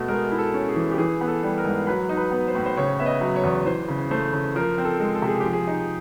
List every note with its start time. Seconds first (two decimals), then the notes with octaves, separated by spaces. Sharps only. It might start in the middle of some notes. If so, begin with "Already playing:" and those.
Already playing: B2 A3
0.08 G#3 A#4
0.32 E4
0.38 A4
0.54 C#4
0.69 G#4
0.76 E3
0.91 G4
0.98 E3 G#4
1.21 B3
1.28 A4
1.43 G3
1.58 A#4
1.65 G#2
1.87 F#3 B4
2.09 D#4
2.17 B4
2.31 B3
2.48 C5
2.55 A2
2.66 C5
2.77 C#3 C#5
2.99 B3 E5
3.06 D#5
3.21 F#3
3.36 C#5
3.44 E2
3.66 E3 C5
3.88 C#3
4.11 A3 C5
4.33 C#3
4.55 F3 A#4
4.78 C4
4.85 A4
5.00 G#3
5.15 A4
5.22 C3
5.28 G#4
5.40 F3 G4
5.53 G#4
5.67 D#4